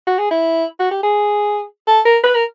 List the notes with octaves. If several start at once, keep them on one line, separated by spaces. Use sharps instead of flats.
F#4
G#4
E4
F#4
G4
G#4
A4
A#4
B4
A#4